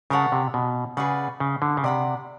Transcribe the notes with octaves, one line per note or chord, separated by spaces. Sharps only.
C#3 A#4 C#5 F#5 A5
C3
B2
C#3 G#4 B4 D5 F#5
C#3
D3
C#3
C3 D5 F#5 B5